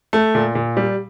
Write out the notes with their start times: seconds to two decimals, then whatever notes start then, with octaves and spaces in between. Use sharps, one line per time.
0.13 A3
0.35 A#2
0.55 A#2
0.77 G3